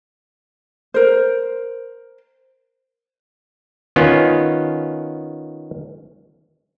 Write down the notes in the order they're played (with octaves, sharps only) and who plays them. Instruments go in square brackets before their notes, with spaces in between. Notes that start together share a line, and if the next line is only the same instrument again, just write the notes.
[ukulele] A#4 C5
[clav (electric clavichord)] D#3 B3 C#4 F4